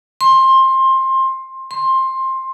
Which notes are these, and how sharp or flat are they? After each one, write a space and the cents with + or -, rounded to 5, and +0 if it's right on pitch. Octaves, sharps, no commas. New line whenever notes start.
C6 +20
C6 +15